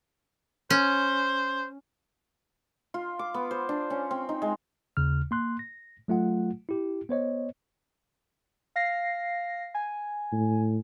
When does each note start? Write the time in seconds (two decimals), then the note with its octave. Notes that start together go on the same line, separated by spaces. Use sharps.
0.70 C#4 C5
2.94 F4
3.19 D6
3.34 B3
3.51 C5
3.69 D4
3.90 C#4
4.11 C4
4.29 D#4
4.42 G#3
4.97 D#2 C#3 F6
5.31 A#3 C6 F#6
5.59 A#6
6.08 F#3 A3 F4 F#5
6.69 E4 G4
7.09 B3 C5 C#5 D#5
8.76 F5 A#6 C7
9.75 G#5
10.32 A2